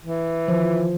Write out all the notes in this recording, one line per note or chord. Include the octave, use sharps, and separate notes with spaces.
E3
D#3 F3 C5